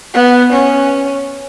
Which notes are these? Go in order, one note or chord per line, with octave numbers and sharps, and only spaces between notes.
B3
C#4